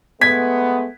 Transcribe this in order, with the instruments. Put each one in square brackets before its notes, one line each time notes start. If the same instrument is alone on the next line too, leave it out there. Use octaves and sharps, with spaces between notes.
[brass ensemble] G#3 A3 B3 [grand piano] G#6 B6